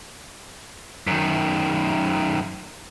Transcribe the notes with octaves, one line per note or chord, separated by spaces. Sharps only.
F#2 D#3